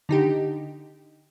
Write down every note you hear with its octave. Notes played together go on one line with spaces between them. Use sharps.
D3 D#4 G4